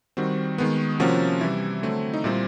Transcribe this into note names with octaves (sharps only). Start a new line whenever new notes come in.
D#3 G3 C4 F#4
D#3 G#3 B3
C3 F3 A#3 C#4 F#4
C3 E3 G3 E4
D3 F#3 A3 C4
D#4
A#2 G3 C4 E4